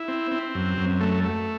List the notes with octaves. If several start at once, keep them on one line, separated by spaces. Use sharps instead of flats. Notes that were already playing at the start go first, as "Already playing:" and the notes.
Already playing: E4
C4
C4
F#2
F#2
A3
A3